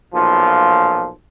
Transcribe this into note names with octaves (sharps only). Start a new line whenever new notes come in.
B1 A#2 F3